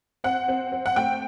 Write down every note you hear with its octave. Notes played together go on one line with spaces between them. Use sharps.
C4 F#5
C4
C4
F#5
A3 G5